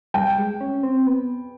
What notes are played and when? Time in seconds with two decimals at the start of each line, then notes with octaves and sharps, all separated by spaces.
0.14 G3 G5
0.38 G#3
0.61 C#4
0.83 C4
1.07 B3